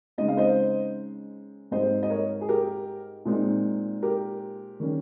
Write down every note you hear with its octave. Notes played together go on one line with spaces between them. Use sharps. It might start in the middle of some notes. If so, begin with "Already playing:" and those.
C#3 G#3 C4 D#4 D#5
F5
C5 D#5
G#2 G3 C4 C5 D#5
D#5
A#4 C#5
G#4
G4 A#4
A#2 G#3 C4 D#4
G4 A#4
D#3 G3 C#4